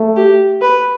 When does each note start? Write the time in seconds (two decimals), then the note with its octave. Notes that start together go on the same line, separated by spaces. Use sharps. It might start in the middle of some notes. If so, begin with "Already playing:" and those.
Already playing: A3
0.16 G4
0.61 B4